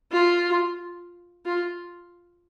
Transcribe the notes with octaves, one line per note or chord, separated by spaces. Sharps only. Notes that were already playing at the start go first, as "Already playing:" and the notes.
F4
F4